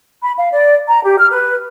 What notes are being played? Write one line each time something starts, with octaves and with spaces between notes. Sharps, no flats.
B5
F5
D5
A#5
G4
F6
B4